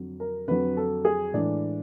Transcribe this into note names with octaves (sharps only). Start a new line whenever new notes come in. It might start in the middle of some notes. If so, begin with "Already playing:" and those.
Already playing: F2 D3 F#3
A#4
F2 D3 F#3 B4
A4
G#4
A2 E3 G#3 D4